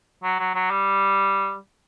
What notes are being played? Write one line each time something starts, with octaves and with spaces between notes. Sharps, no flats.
F#3
F#3
F#3
G3